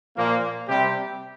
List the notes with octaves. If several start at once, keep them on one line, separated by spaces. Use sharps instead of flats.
A#2 F3 A#3
C3 G3 C4 G4